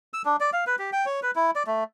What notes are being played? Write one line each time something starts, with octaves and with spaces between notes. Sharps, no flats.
E6
D4
D5
F5
B4
G4
G5
C#5
B4
E4
D5
A3